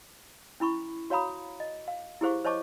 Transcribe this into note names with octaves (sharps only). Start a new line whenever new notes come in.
C#4 E4 B5 C#6
F#4 C#5 F5 A#5 B5 D#6
D#5
F5
E4 G4 G#4 C5 F5 C#6
C5 C#5 D#5 A5 C#6 D6